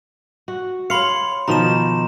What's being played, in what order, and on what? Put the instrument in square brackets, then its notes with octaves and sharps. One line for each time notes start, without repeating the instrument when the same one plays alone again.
[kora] F#4
[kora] C#5 F5 [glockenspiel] B5 C6 C#7
[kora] B2 D#3 F3 [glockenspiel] A#5 E7